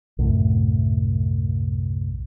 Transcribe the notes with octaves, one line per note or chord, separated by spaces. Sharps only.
C2 F#2 A2 A3